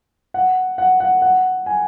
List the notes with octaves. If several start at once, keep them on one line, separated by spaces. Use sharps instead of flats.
F#5
F#5
F#5
F#5
G#5